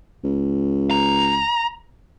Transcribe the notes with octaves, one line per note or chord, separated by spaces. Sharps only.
C#2
A#5